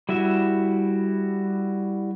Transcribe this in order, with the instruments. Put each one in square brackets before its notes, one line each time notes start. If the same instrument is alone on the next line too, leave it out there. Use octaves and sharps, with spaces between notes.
[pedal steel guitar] G3 E4 F#4 E5